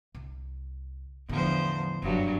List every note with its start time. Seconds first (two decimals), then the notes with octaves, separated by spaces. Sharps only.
0.15 C2
1.29 E2 A2 D3 F3 C5
2.02 F#1 G2 C3 F#3